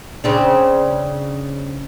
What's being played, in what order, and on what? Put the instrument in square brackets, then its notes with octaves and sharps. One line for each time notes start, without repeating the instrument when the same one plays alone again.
[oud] C#3 C4 D4